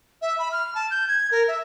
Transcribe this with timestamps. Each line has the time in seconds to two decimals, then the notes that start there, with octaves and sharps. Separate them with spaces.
0.22 E5
0.39 B5
0.52 F6
0.75 A5
0.91 G6
1.08 G#6
1.31 A#4
1.48 E5